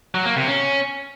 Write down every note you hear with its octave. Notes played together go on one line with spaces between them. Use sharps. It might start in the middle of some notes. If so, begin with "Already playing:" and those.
F#3
A#3
C3
C#4